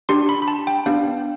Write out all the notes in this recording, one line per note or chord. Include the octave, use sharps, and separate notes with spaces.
D4 G4 C6
B5
B5
A5
G5
B3 D4 G4 F5